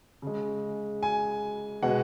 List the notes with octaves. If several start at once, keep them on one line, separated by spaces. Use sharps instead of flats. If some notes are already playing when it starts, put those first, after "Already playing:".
C#3 G#3
G#5
B2 G#3 F#5